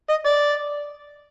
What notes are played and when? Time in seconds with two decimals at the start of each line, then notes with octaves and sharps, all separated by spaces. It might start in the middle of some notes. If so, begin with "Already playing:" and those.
0.09 D#5
0.25 D5